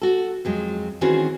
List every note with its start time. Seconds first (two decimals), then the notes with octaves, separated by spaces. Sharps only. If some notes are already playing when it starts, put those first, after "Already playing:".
0.02 F#4 A4
0.45 F2 F#3 G#3
1.01 D#3 E3 C4 C#4 F#4 G#4